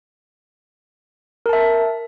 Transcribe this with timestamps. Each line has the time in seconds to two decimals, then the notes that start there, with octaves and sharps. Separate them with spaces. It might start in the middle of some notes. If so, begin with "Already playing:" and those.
1.46 A#4
1.49 A5
1.53 E5